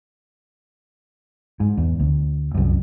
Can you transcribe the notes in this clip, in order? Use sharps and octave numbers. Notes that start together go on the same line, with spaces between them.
G#2
E2
D2
C2 F#2